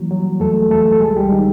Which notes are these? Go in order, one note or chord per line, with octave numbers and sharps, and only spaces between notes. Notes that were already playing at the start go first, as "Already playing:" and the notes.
Already playing: E3 F#3 G3 A#3
F#3
E2 A3 A4
E2 A3 A4
A4
C2 G#3 G#4
G3 G4
D#3 D#4